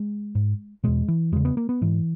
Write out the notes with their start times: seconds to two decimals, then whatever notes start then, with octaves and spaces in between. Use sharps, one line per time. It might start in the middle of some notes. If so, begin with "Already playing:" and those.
Already playing: G#3
0.35 G#2
0.84 E2 B2 G#3
1.08 E3
1.32 E2 C#3 G#3
1.45 B3
1.57 A#3
1.69 B3
1.81 G#2 E3